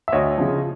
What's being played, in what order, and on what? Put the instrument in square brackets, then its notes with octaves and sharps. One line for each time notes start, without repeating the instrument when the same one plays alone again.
[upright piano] E5
D2 C#5 D#5
C#3 F3